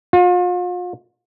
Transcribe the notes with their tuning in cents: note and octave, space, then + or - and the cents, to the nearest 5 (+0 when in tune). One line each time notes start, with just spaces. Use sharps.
F4 +40